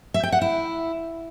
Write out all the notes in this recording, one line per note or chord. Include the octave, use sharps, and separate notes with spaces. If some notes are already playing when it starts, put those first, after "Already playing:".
E5
G5
F#5
E4